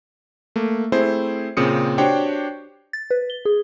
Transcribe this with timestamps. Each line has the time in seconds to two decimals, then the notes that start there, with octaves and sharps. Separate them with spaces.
0.56 A3 A#3
0.92 A3 C4 E4 G#4 C5
1.57 A#2 C#3 C4 D#6 C#7
1.98 D4 F#4 G4 C5 C#5 G5
2.93 A6
3.11 B4
3.30 G7
3.45 G#4